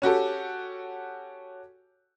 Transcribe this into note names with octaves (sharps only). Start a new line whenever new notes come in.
C#4 F#4 G4 A4